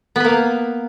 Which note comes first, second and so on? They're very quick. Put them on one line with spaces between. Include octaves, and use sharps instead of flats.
B3 B4 A#3